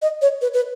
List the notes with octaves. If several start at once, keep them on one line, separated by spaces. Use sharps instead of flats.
D#5
C#5
B4
B4